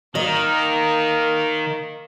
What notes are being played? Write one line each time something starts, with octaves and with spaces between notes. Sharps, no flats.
D#3 A#3 A#4 D#5